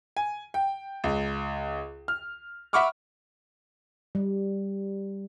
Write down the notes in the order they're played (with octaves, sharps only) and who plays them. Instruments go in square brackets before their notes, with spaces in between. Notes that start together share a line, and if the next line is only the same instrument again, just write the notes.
[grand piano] G#5
G5
C#2
F6
E5 F#5 B5 C#6 D6 F6
[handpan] G3